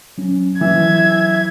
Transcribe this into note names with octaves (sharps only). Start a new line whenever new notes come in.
F#3 C#4
E3 F#3 E5 G#6